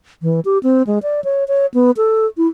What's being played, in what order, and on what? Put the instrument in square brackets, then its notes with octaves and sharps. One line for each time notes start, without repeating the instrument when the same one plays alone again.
[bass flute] E3
G4
C4
G#3
D5
C#5
C#5
B3
A4
E4